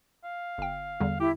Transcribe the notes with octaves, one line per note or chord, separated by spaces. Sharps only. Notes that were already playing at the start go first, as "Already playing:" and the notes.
F5
G1 G5
E2 D3 G3
E4 G4